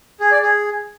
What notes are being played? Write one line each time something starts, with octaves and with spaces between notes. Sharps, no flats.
G#4
D5
G#4